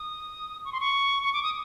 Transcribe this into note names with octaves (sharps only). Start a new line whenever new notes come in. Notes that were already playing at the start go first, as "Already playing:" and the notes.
Already playing: D#6
C#6
C6
C#6
C#6
D6
D#6